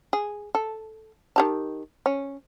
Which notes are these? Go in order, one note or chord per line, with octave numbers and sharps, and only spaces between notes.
G#4
A4
D#3 G4 A5
C#4